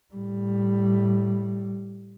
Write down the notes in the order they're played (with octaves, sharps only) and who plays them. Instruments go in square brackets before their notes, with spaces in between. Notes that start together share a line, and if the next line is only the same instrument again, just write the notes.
[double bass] A2 G3